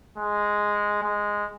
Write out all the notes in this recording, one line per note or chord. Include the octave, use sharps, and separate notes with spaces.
G#3
G#3